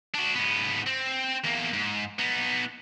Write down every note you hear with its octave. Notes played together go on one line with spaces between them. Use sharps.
D4 F#4
G#2 B3
C4
E2 A#3
G#2
B3 D#4